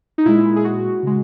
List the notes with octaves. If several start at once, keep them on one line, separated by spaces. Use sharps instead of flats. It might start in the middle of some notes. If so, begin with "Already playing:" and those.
D#4
A#2 G#3 E4
G#4
F#4
C#3 G#3